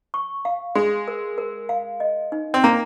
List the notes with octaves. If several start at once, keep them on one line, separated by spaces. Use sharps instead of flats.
C#6
F5
G#3 C6
A#4
A#4
F5
D#5
D#4
C4
A#3 A#5